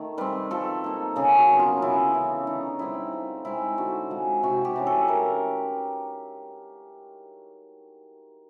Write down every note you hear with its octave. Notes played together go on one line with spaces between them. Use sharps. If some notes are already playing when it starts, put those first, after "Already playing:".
Already playing: D#3 A3
G3 C4 B4
F3 A4
A#3 D#4
C#3 G#4
F#4
F#3 B3
F4
C#3 E4
E3 A3
D3 D#4
G3 C4 D#4 E4
F3
G#3 C4 D#4 E4
D3 F#4
F3 G#3
C3 F#4
G4
E3 A3 C#4
A4
E3 A#4